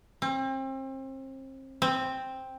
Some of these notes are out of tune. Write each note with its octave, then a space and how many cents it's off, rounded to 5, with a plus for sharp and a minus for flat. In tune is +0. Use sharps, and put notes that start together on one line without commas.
C4 +35
C4 +5